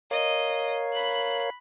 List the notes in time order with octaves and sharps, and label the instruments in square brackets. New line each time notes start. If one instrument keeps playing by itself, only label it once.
[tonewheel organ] A#4 C#5 F5 [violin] D#5
[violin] B5 F#6